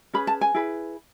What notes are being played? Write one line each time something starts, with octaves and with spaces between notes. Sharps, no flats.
C#4 G#4 B4 B5
A5
G#5
E4 G#4 B4